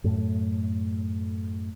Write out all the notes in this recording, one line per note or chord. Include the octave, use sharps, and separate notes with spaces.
F#2 A2 A3